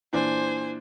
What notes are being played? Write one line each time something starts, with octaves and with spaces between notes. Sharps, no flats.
A#2 E3 D4 C5 G#5